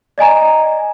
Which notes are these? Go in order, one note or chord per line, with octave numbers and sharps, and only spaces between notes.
D5 D#5 G#5 A#5